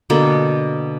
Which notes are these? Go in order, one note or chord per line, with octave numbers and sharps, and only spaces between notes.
B2 D3 A#3 A4